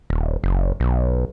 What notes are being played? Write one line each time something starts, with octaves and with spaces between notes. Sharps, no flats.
D#1
F#1
B1